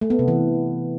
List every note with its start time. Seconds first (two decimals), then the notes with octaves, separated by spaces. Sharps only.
0.01 A3
0.10 B3
0.19 C3
0.28 E3